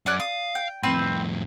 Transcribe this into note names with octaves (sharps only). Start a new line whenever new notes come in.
F#2 C#4 D5 F#5 F#6
F5 D#6
G5
F2 A2 C4 B4 E6